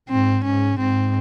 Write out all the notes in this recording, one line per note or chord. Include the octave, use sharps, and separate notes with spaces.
G#2 C4
G#2 C#4
G#2 C4